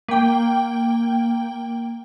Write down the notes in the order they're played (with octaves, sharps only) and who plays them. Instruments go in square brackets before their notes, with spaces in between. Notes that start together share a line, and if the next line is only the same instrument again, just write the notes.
[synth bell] A#3 G5